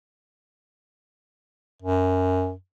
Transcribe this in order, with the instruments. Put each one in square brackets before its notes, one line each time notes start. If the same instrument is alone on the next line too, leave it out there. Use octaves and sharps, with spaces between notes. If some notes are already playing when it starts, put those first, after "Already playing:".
[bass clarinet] F#2